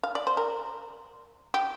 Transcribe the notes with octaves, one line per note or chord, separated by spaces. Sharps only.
F5
D5
C5
A#4
G4